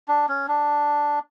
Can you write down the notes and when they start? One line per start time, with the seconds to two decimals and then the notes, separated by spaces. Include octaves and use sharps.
0.08 D4
0.29 C#4
0.48 D4